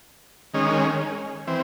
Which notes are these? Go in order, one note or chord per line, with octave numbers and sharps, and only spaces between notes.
D#3 G#3 C#4
E3 C4